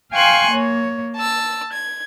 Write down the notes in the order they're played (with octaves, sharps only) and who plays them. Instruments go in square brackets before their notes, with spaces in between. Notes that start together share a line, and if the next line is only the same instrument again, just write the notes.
[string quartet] F5 G5 G#5 C6 C#6 F#6
A#3 C#5
A5 E6
G#6